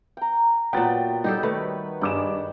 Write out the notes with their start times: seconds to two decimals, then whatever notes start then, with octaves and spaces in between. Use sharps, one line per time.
0.17 G5 A#5
0.73 A#2 F#3 B3 B4 G5 A6
1.24 G3 D#4 G4 A4
1.43 D#3 A3 B4 C#5
2.01 G2 G#3 F#5 G5 D6 E7